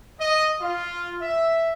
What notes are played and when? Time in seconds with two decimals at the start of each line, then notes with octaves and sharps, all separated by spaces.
0.20 D#5
0.61 F4
1.22 E5